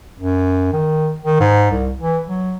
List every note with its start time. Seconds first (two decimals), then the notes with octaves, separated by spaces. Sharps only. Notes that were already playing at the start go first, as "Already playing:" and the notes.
0.19 F#2
0.73 D#3
1.25 D#3
1.40 G#2
1.71 C2
2.01 E3
2.28 F#3